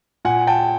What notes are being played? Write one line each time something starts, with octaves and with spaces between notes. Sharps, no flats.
A#2 F#5 G#5
G5 A5